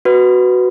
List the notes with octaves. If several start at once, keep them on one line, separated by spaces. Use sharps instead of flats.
F#4 B4